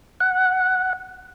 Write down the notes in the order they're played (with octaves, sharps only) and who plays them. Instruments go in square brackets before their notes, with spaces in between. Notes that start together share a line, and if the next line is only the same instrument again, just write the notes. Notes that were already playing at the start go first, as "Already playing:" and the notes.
[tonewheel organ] F#5